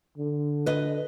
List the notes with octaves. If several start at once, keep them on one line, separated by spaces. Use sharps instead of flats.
D3
B4 D#5